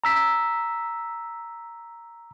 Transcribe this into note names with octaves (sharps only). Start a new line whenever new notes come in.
A#5 E6 B6